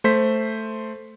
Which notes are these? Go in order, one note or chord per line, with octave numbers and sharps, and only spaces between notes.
A3 C5 B6